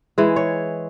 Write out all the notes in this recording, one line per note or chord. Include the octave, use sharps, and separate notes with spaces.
E3 G#3
C#5